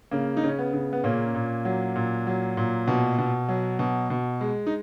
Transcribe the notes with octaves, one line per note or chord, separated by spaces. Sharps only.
C#3 A#3
D#4
C#3 C#4
B3
C#3
B3
A#2 A#3 C#4
A#2
F#3
A#2
F#3
A#2
B2
B2
F#3
B2
B2
G#3
D#4